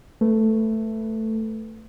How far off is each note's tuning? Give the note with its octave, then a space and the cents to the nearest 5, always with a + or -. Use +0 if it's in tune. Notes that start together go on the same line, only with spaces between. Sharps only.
A3 +5 B4 +0